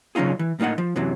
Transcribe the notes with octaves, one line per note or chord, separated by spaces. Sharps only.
C#3 F#3 C#4 D#4 F4 G#4
E3
A2 A#3 D#4 D#5 F#5
F3
F#2 C3 E3 F#3